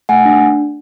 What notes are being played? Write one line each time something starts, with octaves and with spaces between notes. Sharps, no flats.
A3 F#5 G#5
D4